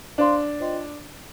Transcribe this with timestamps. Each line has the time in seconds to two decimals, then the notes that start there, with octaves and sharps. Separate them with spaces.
0.18 D4 C5 F5 C6
0.60 F4 C5 D#5 G5 C6